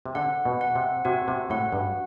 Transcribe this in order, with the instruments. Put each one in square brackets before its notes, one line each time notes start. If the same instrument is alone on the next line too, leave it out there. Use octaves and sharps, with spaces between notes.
[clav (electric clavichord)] C3
[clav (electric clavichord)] D3 [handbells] F#5
[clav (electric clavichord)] B2
[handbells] F#5
[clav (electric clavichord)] C3
[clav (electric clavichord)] C3 [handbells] F#4
[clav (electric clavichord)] C3
[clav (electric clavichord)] A2 [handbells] F#5
[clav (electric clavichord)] G2